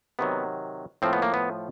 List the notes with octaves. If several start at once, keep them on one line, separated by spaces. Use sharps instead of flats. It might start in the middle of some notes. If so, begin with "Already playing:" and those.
C3 D#3 F#3 B3
A2 F3 A#3 C4
B3
A#3
B3